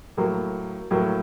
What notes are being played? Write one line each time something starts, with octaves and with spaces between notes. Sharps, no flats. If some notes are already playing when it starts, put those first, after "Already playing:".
A2 F#3 A#3
A2 F#3 A#3